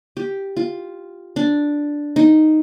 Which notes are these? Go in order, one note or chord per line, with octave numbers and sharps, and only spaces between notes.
G4
F4
D4
D#4